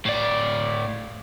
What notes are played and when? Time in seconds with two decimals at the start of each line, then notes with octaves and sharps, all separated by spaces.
0.05 A2 D5